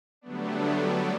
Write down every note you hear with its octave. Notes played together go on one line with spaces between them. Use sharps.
D3 F#3 G3 A3 B3 D4